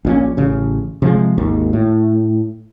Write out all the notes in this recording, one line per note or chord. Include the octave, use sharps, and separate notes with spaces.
A#1 A#2 C#4
A1 C#3
C3 F3 G#3
G#1 D#2
A2